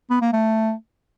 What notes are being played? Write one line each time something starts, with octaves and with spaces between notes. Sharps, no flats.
B3
A#3
A3